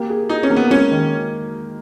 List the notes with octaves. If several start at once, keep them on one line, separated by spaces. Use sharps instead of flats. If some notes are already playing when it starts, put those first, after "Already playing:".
Already playing: A#3 G4
G#4
D#4 G#4
C#4
A#3
B3
G#3 C#4
D#3